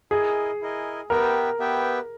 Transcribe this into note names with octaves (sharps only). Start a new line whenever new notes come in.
E4 G#4 A#4 D#5 G#5
E4 A#4 D#5 G#5
B3 G4 A#4 B4 E5 G5
B3 G4 B4 E5 G5